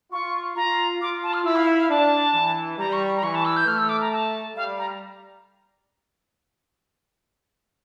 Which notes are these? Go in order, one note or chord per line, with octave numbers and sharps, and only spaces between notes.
F4 C#6
F4 A#5
F4 D6
A5
F6
E4 E6
F5
E5
F5
D4 A5
E3
G3 A#5
C#6
A#5
E3 C#6
A5
E6
G6
A3 F6
E6
D6
A#5
A5
G3 F5
A#5